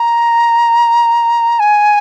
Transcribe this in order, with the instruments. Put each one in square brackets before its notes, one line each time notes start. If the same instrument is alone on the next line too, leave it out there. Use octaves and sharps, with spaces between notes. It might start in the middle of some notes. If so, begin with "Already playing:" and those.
Already playing: [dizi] A#5
G#5